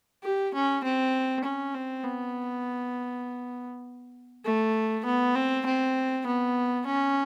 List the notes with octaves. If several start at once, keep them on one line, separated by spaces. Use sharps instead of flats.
G4
C#4
C4
C#4
C4
B3
A3
B3
C4
C4
B3
C#4